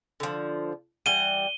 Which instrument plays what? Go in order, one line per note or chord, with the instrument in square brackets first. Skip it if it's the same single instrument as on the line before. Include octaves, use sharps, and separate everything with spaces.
[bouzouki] D3 F3
[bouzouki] E3 G3 F#5 [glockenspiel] D#7 G7